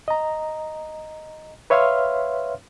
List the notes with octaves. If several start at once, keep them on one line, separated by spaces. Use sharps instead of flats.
D#5 A#5
B4 C#5 E5 F5 C6 F6